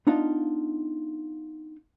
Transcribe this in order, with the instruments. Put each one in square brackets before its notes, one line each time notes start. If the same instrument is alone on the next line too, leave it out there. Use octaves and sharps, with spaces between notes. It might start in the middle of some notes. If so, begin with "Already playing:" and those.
[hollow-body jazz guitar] B3 D4 D#4 F4 F5 A5